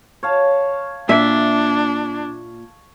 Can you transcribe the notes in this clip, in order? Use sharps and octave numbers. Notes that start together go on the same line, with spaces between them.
C#5 F5 A5
A#2 D4 E5